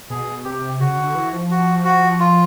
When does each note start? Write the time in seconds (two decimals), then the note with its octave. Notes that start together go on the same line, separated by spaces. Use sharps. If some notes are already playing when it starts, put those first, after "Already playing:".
0.10 B2 G#4
0.44 C3 G4
0.80 C#3 F#4
0.97 D3
1.15 E3
1.33 F3
1.51 F#4
1.84 F#4
2.20 F4